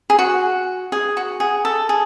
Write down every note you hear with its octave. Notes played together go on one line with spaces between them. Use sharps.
G#4
F#4
G#4
F#4
G#4
A4
G#4